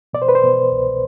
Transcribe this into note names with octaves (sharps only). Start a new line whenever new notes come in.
B2 D5
C5
B4
C5
B2
C2